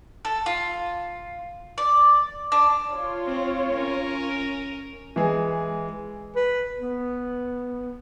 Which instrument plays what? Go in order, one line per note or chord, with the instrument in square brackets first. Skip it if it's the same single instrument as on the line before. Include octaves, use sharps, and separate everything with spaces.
[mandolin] A4
F4
D5
D4
[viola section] F4 C#5
[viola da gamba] C4
C#4 A#4
[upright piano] E3 G#3 G#4
[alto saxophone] B4
B3